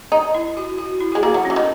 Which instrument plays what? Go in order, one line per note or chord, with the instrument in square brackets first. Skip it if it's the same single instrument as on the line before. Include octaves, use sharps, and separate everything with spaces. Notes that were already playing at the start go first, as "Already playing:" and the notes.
[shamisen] D#4
[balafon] E4
F#4
F#4
E4
F#4
[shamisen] G#3
[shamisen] A#3 [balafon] G#4
[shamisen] F#3
[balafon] C#4
[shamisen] E3
D#3